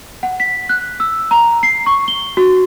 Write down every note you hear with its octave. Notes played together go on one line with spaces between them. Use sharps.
F#5
B6
F#6
E6
A#5
C7
C#6
G7
F#4